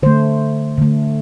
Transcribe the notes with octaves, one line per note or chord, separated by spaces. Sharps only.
D3 A3 C5
D3 A3